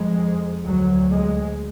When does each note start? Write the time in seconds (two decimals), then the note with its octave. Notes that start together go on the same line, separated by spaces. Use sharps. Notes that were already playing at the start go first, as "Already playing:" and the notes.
Already playing: F2 G#3
0.64 D2 F#3
1.10 G#3